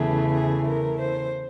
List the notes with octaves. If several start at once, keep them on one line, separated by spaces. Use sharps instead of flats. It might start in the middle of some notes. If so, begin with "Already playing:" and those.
Already playing: E2 C#3 E3 A3 G#4
G#4
A#4
C5